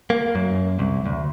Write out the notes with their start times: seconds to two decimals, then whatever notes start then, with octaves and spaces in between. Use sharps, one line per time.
0.10 A#3
0.35 F#2
0.79 C2
1.06 D2